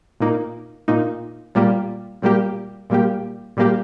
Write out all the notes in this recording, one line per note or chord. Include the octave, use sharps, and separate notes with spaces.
A#2 A#3 D#4
A#2 A#3 D#4
A#2 G3 A#3 G4
A#2 G3 A#3 G4
A#2 G3 A#3 G4
A#2 G3 A#3 G4